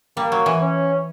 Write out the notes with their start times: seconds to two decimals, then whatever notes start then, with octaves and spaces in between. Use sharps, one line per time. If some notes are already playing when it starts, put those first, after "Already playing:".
0.17 G3 A#3
0.32 F#3
0.46 E3
0.61 C#4